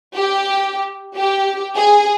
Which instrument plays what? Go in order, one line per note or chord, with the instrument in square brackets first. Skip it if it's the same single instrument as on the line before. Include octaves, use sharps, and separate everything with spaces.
[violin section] G4
G4
G#4